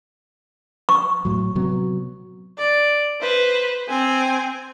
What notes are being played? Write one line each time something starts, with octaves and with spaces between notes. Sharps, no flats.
C#6
A2 F#3
C3 F#3 B3
D5
B4 C5
C4 G#5